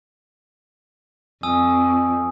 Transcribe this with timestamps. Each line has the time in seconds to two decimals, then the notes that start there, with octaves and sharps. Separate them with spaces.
1.43 F2 G#5 D#6 E6